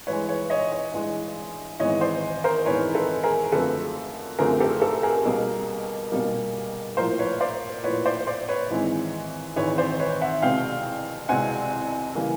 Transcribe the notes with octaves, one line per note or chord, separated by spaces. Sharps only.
G2 E3 G#3 B4 C#5
B4 C#5
C#5 D#5
C#5 D#5
G2 E3 G#3
G#1 G#2 E3 G#3 B3 C#5 D#5
C5 D5
A#4 C5
G#1 G#2 E3 G#3 B3 B4 C#5
A4 B4
G#4 A#4
F#2 D3 F3 A3 C4 A4 B4
F#2 D3 F3 A3 C4 G#4 A#4
G4 A4
G4 A4
G#4 A#4
B1 B2 G3 A#3
B1 B2 G3 A#3
A#1 A2 F3 A#4 C5
B4 C#5
C5 D5
A#1 A2 F3 B4 C#5
C5 D5
C5 D5
B4 C#5
G#1 G#2 E3 G#3 C4
G#1 G#2 E3 G#3 C4 B4 C#5
C5 D5
B4 C#5
E5 F#5
C2 B2 G#3 C4 F5 G5
C2 B2 G#3 C4 F#5 G#5
C#3 E3 G3 A#3